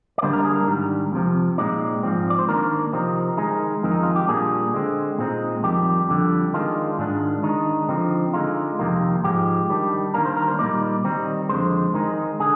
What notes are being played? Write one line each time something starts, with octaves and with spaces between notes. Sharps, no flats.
D5
D3 G3 A#3 D4 C5
A#4
G#4
A#4
G#2 D#3 G3 D4
F2 C3 F3
A#2 G#3 C4 D#4 D5
G#2 F3 C4
D5
C5
D#3 A#3 D4 A#4
C3 F3 C4 D#4
D#3 G#3 D#4
F2 D#3 G#3 C4
D#4
F4
G4
A#2 G3 A#3 D4 G#4
D3 G#3 C4
A#2 G#3 C4 D#4
F2 D#3 G3 G4
F2 D3 G3
D#3 G#3 D4 F4
G#2 D#3 G#3 D4
D#3 G#3 D4 D#4
D3 F3 C4 D#4
D3 G#3 D#4 F4
F2 C3 D#3 A#3
G#2 F3 G#3 G4
D#3 G3 D4
D#3 G3 A#3 D4 A#4
C5
A#4
C5
A#2 G3 A#3 D#4 D5
D#3 G3 C4 D#4
F2 D3 G#3 C5
D#3 G#3 D#4
D3 G#4